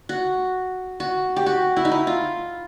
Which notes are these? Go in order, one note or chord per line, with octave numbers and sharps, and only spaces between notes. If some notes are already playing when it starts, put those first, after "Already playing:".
F#4
F#4
G4
F#4
E4
D#4
E4
F4